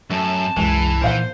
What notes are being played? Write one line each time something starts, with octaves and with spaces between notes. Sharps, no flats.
F#2 A3 A5
C2 F#2 E3 G#3 G#4
A#2 D#3 A#4 C5 F5 F#5